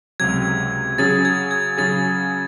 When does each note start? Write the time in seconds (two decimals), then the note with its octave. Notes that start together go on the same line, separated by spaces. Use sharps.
0.20 C#2 C3 F#3 G#6
0.98 C#3 F#3 C#4 G#4 A6
1.25 G#6
1.51 G#6
1.78 C#3 F#3 C#4 G#4 A6